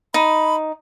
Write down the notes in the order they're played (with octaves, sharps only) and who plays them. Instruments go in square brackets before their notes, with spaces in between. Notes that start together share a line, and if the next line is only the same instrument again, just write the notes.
[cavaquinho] D#4 [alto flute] B5